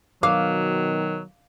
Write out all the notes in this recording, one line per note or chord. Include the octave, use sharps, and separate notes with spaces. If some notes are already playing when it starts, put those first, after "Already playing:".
B2 D#3 F#3 F5 D6